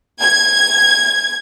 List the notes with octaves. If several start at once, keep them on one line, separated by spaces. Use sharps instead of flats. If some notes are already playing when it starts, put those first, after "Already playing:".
G#6